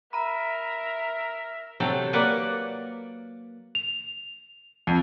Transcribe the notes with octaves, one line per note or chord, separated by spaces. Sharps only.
A#4 E5 A#5 B5
C3 F#3 A4 G5
A#3 B4 D5 F#5
F7
F2